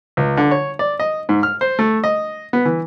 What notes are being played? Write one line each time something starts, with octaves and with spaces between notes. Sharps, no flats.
C#2
D3
C#5
D5
D#5
G#2
F6
C5
A3
D#5
B3
E3